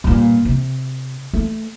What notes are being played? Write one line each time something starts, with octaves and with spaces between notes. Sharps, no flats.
G2 A#2
C3
A3